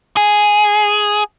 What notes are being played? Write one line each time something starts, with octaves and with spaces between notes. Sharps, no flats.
G#4